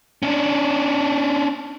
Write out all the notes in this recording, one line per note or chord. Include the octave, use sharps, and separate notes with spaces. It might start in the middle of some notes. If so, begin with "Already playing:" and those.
C#4 D4